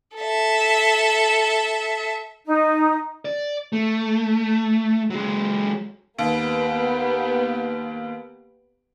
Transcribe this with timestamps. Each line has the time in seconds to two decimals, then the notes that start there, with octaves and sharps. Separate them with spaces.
0.16 A4 E5
2.46 D#4
3.25 D5
3.73 A3
5.10 F#3 G#3
6.19 D#2 A#3 B3 G4